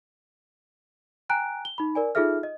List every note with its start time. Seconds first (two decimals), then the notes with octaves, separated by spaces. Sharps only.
1.29 G5 G#5 A#5 F#6 D7
1.65 G7
1.78 D#4 B5
1.95 A#4 D5 G#5
2.15 D#4 F4 G#4 A4 E5 F6
2.43 D#5